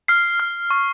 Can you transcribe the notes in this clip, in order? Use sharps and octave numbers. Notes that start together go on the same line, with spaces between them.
F6 C7
F6
C#6